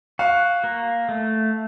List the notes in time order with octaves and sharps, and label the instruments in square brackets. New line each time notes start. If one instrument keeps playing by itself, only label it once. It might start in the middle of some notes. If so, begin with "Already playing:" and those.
[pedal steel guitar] F#4 [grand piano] F5
[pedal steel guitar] A#3
A3